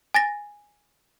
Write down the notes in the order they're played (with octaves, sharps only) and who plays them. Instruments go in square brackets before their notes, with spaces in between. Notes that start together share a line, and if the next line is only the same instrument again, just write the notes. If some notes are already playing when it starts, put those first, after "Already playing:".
[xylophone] G#5 A6 A#6